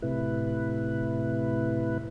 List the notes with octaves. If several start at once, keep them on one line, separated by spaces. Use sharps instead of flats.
A2 C3 E4 B4